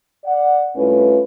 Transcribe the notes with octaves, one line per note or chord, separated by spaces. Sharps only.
D5 F#5
C2 A3 C#4 E4 F4 B4